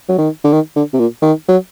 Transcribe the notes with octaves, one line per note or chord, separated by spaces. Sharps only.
F#3
D#3
D3
D#3
D3
C3
A#2
D#3
F#3